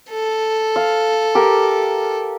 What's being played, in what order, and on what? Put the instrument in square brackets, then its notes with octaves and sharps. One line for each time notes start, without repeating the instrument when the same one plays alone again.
[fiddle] A4
[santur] F5
G4 A#4